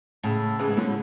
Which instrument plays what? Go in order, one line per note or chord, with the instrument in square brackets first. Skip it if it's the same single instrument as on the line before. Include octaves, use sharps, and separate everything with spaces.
[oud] A2 [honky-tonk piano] C#3
[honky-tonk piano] C#3 [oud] E3 G#3
[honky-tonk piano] G#2
[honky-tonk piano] A2 [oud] D3 F#3